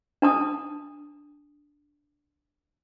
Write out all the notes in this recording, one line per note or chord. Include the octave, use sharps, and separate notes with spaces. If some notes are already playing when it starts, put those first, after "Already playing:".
D4 A5 D#6